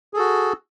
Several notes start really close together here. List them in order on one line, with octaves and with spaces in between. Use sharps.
G#4 A4 F#4